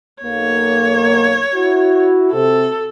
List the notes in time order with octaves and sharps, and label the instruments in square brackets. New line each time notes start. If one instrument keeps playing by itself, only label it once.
[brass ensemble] B1 A#3 [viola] C#5
[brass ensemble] E4 F#4
[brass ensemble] C3 [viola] A4